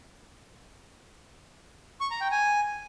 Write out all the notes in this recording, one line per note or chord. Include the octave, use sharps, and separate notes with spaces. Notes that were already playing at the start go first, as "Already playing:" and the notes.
C#6
A#5
G5
G#5